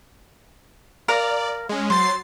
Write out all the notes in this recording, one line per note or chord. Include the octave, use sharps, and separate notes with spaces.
A#4 D5 F5 A#5
G#3 C#4
F#3 C5 A6 C7